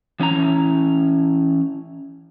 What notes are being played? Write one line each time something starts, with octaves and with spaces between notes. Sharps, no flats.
E3 C#4 E4 A#5